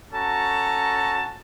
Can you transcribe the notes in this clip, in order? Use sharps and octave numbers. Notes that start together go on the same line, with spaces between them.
C#4 F#4 A4 A5 A#5